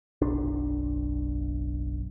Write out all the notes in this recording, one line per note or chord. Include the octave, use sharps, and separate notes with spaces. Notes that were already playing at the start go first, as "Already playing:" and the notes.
F#1 B1 D4